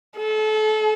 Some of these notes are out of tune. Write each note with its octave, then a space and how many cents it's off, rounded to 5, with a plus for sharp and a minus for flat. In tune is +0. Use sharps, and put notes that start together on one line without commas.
A4 -30